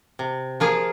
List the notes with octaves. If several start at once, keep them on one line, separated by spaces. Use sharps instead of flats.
C3
F3 A#3 F4 G#4